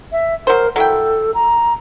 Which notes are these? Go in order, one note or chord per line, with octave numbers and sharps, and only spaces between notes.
E5
F#3 A#4 C5
F#3 E4 A4 G5
A#5